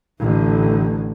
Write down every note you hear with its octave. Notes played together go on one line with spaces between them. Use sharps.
A1 D3